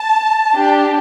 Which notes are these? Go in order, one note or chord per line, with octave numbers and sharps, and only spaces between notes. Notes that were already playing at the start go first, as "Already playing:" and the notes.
Already playing: A5
D4 G4